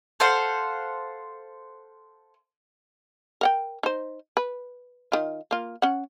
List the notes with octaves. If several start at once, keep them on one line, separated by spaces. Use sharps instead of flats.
A4 C5 F5 F#5
A#4 F#5 G5
D#4 C5
B4
D#3 F4
A#3 F4
C#4 F#5